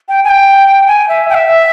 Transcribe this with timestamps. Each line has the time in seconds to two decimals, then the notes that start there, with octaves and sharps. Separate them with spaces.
0.09 G5
0.24 G#5
0.29 G5
0.88 G#5
1.09 E5
1.29 G5
1.34 E5